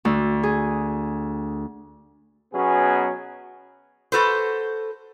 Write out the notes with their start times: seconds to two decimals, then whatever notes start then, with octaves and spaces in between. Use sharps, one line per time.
0.05 D2
0.43 G#4
2.53 B2 F#3 B3 C#4 G#4
4.12 F#4 A4 B4 C5